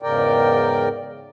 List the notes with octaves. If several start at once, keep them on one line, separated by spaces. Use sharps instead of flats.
E2 G#2 C#3 A#4 D5 G5